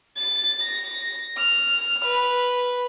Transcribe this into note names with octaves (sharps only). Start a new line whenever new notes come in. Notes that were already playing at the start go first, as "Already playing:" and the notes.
A6
A#6
F6
B4